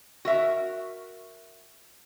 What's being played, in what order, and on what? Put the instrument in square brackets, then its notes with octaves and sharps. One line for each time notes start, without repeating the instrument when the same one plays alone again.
[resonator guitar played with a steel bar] F#4 A#4 E5